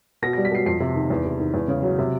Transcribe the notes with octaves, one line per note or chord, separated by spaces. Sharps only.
B2 A#6
A#6
G3
B6
B2 C7
F2 C7
C3
D#3
E2
C3
D#3
E2
C#3
F#3
C3